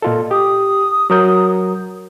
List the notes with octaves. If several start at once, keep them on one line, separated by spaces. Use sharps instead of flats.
A#2 F4 A4 D#5
G4 D#6
F#3 A#4 G6